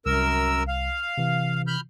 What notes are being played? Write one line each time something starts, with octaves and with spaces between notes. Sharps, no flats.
C2 F#2 A#4 E6
F5
C3 E3
B5 F6 G6